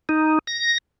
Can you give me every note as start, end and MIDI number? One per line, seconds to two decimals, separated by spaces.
0.09 0.39 63
0.47 0.78 94